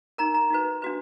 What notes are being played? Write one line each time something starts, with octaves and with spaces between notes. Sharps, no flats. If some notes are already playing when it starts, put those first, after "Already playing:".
D#4 A#4 A#5
A#5
D#4 F#4 B4
D4 F#4 B4